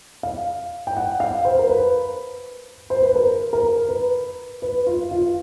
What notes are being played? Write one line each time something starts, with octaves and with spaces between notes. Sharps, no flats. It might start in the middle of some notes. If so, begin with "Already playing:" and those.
F5
G5
F#5
F5
C5
A#4
B4
C5
B4
A#4
A#4
B4
B4
F4
F4